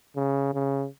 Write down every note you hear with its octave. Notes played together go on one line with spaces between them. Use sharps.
C#3
C#3